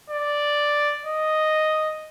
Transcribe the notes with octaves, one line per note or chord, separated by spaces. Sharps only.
D5
D#5